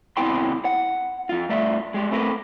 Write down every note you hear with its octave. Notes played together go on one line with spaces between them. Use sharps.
D#2 C3 B3 E4 G5 C6
F#5
F2 F4
G2 A3 D5 E5
G#3 G4
A3 C4 E4 F#4 A#4 B4